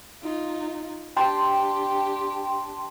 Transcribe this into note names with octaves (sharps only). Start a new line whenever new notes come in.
D#4 F4
D4 G4 G5 A5 C6